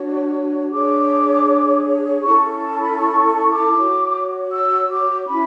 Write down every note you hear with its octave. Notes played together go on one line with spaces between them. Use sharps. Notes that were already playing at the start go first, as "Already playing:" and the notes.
Already playing: D4 F#4 C#5
D4 G#4 C#5 D6
C#4 E4 A4 C#6
A5
B5
C#6
C#6
D6
F#4 C#5
E6
D6
C#4 E4 B5